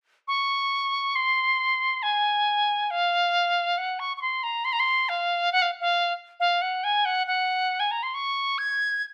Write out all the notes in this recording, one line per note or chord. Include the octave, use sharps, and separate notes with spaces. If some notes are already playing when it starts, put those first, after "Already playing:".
C#6
C6
G#5
F5
F#5
C#6
C#6
C6
A#5
C6
A#5
C6
F5
F#5
F5
F5
F5
F#5
G#5
F#5
F#5
G#5
A#5
C6
C#6
G#6